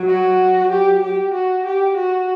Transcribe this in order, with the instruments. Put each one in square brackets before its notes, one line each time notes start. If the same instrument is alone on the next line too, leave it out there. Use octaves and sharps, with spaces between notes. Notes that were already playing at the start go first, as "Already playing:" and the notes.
Already playing: [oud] F#3
[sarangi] F#4
G4
G4
F#4
G4
F#4